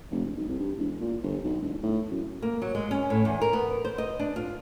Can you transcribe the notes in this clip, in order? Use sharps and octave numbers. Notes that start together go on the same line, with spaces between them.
F1
E1
B1
C2
G2
E1
A#2
G1
B1
E1
A2
F#2
A#3
F#3
G#3
C#4
A2
E2
A#4
B3
C5
D#5
D4
F4